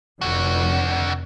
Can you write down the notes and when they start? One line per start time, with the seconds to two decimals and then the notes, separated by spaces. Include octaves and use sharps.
0.21 F1 F2 D3 F#4